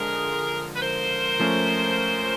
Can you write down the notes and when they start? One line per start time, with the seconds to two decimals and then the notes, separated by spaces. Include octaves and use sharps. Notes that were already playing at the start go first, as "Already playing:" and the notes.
Already playing: D3 F3 G#3 F4 G#4 A#4
0.75 B4
0.81 A#4 C5
1.39 F3 A3 C#4